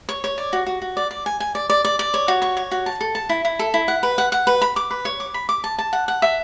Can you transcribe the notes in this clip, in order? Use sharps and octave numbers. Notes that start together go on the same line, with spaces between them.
C#5
C#5
D5
F#4
F#4
F#4
D5
D5
G#5
G#5
D5
D5
D5
D5
C#5
F#4
C#5
C#5
F#4
A5
A4
A5
E4
E4
A4
E4
F#5
B4
F#5
F#5
B4
B5
D6
B4
C#5
D6
B5
D6
A5
A5
F#5
F#5
E5